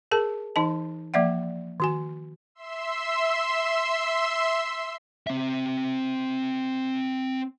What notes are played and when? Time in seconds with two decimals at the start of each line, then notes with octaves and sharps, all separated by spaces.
0.11 G#4 A#4 A5
0.56 E3 D#4 D#5 A5
1.14 F3 A#3 D5 E5 F#5
1.80 D#3 F#4 G#5
2.55 E5 C6 E6
5.27 C4 E5